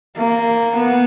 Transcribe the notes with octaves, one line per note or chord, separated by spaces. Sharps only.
A#3
B3